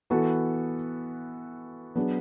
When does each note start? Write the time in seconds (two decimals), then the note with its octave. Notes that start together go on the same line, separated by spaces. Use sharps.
0.10 E3 B3 F#4 A4
1.96 F#3 B3 D4 G#4